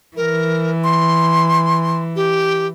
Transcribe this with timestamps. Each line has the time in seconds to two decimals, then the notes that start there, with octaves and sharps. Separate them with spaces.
0.17 E3 A#4
0.84 C6
2.16 G4